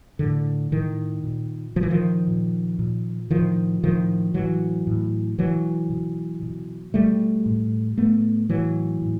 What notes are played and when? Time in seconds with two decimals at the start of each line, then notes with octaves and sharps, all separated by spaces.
0.19 A2 D3
0.72 A2 D#3
1.24 A#2
1.76 A#2 F3
1.83 E3
1.90 D#3 F3
2.27 A#2
2.79 A#2
3.31 A2 D#3 F3
3.83 A2 D#3 F3
4.34 A2 E3 F#3
4.87 A2
5.39 B2 E3 F#3
5.90 B2
6.43 B2
6.94 B2 G3 A3
7.46 A2
7.98 A2 A3 B3
8.49 A2 E3 F#3
9.02 A2